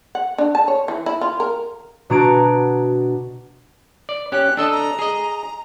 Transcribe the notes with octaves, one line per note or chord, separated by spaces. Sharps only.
F#5
D4
A5
C#5
E3
E4
F4
A#4
B2 D4 F#4 A#5 G#6 D7
D5
C#4 G4 F#6
D4 A4 D#5 E6
A#5
G#4 D#5